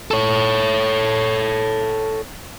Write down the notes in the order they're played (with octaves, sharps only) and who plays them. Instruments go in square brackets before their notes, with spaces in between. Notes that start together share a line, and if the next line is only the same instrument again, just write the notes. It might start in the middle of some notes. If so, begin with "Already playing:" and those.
[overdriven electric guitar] A4 C#5